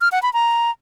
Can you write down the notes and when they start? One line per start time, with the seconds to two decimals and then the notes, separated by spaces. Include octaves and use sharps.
0.01 F6
0.12 F#5
0.23 B5
0.33 A#5